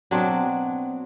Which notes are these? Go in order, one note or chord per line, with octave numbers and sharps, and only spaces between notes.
B2 F#3 C4 D4